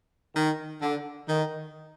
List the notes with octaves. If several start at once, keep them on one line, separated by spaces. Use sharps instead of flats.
D#3
D3
D#3